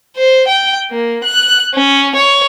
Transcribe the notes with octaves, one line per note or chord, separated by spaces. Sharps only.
C5
G5
A#3
F#6
C#4
C#5